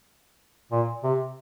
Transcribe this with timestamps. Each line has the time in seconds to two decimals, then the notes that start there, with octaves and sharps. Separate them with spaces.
0.72 A#2
1.04 C3